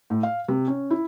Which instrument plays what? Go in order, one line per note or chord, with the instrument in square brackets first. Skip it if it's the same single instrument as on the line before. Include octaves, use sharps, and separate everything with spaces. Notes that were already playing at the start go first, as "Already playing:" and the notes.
[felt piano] A2
F5
C3
C#4
E4